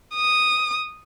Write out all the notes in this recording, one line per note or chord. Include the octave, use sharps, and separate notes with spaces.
D#6